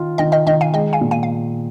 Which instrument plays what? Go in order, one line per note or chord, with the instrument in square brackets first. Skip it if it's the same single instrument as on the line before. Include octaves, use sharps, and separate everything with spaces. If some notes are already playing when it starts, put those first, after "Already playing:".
Already playing: [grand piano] D#3 F4
[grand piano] D#3 [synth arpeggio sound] D#5 G5
[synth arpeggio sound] D#5 G5
[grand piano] D#3 [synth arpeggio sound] D#5 G5
[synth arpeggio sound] F5 G#5
[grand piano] G#3 [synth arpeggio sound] D#5 G5
[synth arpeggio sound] F5 G#5
[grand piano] A#2
[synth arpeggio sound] F5 G#5
F5